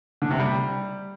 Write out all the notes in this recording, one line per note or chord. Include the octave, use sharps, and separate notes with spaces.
D3
C3
G3